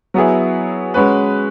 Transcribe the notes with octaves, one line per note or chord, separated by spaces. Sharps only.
F#3 B3 E4 G#4
G#3 C#4 F#4 B4